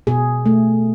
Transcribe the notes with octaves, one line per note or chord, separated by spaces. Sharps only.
B2 G#4
A3